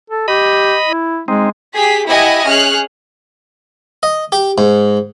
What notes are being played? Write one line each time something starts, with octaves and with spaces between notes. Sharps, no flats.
A4
G4 D#5 B5
E4
G#3 C4 D#4
G4 G#4 B6
E4 G4 D#5 E5 F#5 G#5
C#4 G#4 F6 F#6
D#5
G4
G#2